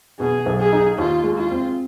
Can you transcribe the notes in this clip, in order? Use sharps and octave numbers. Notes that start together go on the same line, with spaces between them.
B2 G#4
B1
G#4
D#4
D#2 F4
G#3
F4
C4